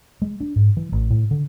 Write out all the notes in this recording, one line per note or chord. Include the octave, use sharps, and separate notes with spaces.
G#3
D4
G#2
E3
A1
A2
D3